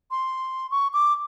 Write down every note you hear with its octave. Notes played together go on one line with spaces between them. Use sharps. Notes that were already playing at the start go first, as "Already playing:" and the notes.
C6
C#6
D6